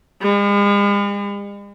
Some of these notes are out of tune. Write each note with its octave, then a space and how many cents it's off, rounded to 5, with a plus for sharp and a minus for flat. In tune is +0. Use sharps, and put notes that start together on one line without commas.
G#3 -45